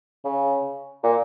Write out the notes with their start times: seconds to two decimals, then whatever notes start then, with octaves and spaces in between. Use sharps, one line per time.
0.25 C#3
1.03 A#2